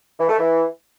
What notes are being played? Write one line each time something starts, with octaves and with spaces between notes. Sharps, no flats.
E3
A3
E3